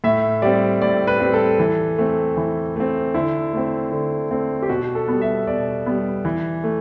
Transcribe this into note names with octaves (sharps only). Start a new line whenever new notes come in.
A2 E5
G3 C4 D5
A2 D5
B4
G3 C4
A4
E3
A3 C4
E3
A3 C4
D3 E4
A3 C4
D3
A3 C4
G4
B2 F#4
A4
G3 B3
E5
B2 D5
G3 B3
E3
A3